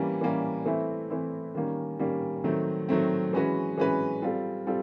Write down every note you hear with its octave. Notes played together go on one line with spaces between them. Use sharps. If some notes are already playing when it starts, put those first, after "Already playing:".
Already playing: E3 G3 A#3 C#4
E3 G3 A#3 C#4
E3 A3 C4 E4
E3 A3 C4 E4
D#3 G3 A#3 C#4
D#3 G3 A#3 C#4
D#3 F#3 A3 C4
D#3 F#3 A3 C4
E3 G#3 C#4 F#4 B4
E3 G#3 C#4 F#4 B4
G3 C4 F4 A4
G3 C4 F4 A4